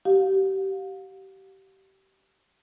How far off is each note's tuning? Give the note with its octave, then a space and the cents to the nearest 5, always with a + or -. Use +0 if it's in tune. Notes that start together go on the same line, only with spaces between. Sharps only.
G4 -30 F5 +40